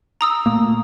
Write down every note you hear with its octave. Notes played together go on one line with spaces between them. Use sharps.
A#5 D#6 E6
A#2 A3 A#3